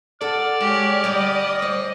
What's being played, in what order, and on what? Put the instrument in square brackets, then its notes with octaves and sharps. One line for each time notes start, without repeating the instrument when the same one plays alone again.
[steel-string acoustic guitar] A4 F#5 [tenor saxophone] D5 [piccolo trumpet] F6
[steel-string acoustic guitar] G#3 [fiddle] G4 C#5
[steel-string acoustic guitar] D2 G3 G4 [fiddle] D#5
[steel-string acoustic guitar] C5 C#5